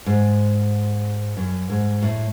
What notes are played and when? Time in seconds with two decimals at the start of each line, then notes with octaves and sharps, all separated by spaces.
0.06 G#2
1.37 F#2
1.70 G#2
2.02 A2